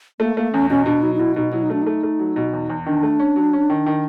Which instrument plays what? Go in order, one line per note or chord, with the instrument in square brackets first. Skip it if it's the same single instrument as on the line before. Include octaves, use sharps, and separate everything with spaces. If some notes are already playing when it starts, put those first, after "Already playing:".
[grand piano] A3 [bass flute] A#3
[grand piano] A3 [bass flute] A#3
[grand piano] E2 [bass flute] C#4
[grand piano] B2 [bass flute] C#4
[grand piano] B2 [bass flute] D4
[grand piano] F#3 [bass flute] D#4
[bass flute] D#4
[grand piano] B2 [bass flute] E4
[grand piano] B2 [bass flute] D#4
[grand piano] F#3 [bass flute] E4
[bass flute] D#4
[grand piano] A3 [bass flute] D4
[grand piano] A3 [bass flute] D#4
[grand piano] A3
F#3
B2
E2
E2
[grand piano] D#3 [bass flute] D4
[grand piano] A3
C#4
F#3
C#4
D#3
D#3